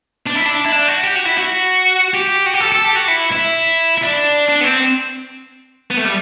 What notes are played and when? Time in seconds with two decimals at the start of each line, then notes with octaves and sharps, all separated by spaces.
0.26 D4
0.35 E4
0.46 D4
0.65 E4
0.72 D4
0.88 F#4
1.04 G4
1.16 F#4
1.26 E4
1.39 F#4
2.14 G4
2.46 F#4
2.54 G4
2.61 A4
2.72 A4
2.85 G4
2.96 F#4
3.08 E4
3.32 E4
3.98 E4
4.02 D4
4.49 D4
4.61 B3
4.64 C4
5.91 B3
5.98 A3
6.05 G3